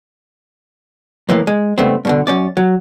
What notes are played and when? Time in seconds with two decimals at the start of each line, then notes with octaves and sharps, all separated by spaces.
1.29 F2 A2 E3 A#3
1.47 G#3
1.78 C#2 G2 A3 B3 C4
2.05 G2 B2 D3
2.27 F#2 C#4 D5
2.57 F#3